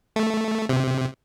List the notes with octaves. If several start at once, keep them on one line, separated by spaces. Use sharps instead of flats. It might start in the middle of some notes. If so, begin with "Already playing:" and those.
A3
C3